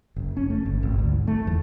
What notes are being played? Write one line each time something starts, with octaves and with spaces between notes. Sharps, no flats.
F#1
C#4
A3
G1
G#1
D2
G#2
A3
E2